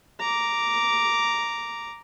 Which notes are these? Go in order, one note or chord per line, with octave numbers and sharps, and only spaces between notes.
A#5 D6